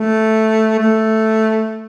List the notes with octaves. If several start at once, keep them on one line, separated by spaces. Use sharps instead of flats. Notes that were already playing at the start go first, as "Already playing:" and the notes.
Already playing: A3
A3